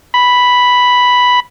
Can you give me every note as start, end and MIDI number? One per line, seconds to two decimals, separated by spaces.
0.14 1.40 83